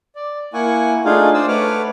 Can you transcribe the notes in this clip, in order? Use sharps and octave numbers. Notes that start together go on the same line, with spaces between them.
D5
A#3 E4 F#5 G#5 C#6
A3 D4 D#4 F4 G#4 F5
C5 D5 D#6 E6
A3 B4 C#5 F#5 D6 F6